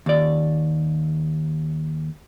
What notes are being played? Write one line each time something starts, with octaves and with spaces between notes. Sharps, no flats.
D#2 D5